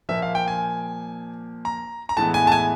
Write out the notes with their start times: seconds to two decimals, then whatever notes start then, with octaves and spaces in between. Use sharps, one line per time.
0.09 A#2 F3 A#3 E5
0.22 F5
0.35 G5
0.48 G#5
1.65 A#5
2.09 A#5
2.17 A2 E3 G#3 B3 A5
2.34 G#5
2.47 A5
2.52 G#5